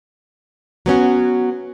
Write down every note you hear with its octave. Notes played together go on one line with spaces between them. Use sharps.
F#3 B3 C#4 F#4